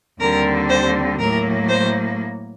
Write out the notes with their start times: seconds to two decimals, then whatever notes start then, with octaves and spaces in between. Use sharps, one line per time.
0.19 D#2 D3 G3 C4 A#4
0.69 C5
1.19 A2 F#3 A#3 A#4
1.68 C5